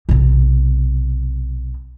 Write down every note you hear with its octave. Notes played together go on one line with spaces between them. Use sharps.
B1 C3